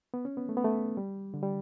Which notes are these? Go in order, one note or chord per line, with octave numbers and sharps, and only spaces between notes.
B3
C#4
B3
A3
B3
A3
G3
D3
G3